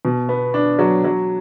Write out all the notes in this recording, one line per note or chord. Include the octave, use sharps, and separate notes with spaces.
B2
B3
D4
F#3
F#3